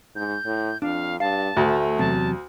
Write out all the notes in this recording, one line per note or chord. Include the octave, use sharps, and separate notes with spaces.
G#2 G6
A2
F2 D4 F5
G2 F5 A5
D2 A3
E2 C3 F#3 A5